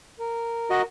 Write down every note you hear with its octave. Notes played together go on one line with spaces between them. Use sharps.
A#4
F#4 D#5